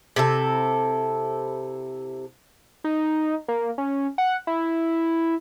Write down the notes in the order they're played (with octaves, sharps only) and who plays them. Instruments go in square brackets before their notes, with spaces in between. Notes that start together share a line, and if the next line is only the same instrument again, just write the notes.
[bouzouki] C3 E4 A4
[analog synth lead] D#4
A#3
C#4
F#5
E4